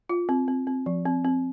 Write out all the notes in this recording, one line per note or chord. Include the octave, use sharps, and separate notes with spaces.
F4
C4
C4
C4
F3
C4
C4